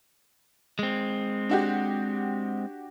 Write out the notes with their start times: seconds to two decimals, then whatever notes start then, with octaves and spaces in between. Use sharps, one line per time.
0.79 G#3 C4
1.49 D4 F#4 G4